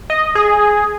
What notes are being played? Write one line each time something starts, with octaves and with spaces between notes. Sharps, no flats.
D#5
G#4